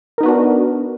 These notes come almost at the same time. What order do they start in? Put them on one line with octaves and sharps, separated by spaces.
A#4 D#4 B3 F#4 D4